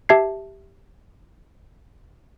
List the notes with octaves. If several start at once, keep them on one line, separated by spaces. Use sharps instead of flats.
G4 E5 A5 G#6 C7